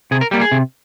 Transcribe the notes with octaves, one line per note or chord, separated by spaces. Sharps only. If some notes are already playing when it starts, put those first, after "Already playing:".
C3 G#4
A#4
G3 A#3 G4
G#4
C3